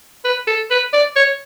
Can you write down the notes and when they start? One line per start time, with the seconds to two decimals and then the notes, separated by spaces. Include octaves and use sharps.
0.25 B4
0.47 A4
0.71 B4
0.93 D5
1.16 C#5